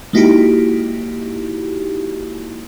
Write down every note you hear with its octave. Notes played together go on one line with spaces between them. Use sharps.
G#3 A#3 D#4 E4 F#4 G4